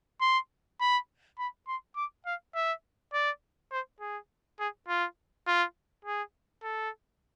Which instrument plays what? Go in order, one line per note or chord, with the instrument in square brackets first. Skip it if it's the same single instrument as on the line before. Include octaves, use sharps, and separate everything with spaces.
[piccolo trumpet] C6
B5
B5
C6
D6
F5
E5
D5
C5
G#4
G#4
F4
F4
G#4
A4